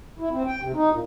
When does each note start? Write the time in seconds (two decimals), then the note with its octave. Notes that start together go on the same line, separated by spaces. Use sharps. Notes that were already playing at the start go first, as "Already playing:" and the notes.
0.19 E4
0.31 C4
0.46 G5
0.62 C3
0.74 D#4
0.92 A#2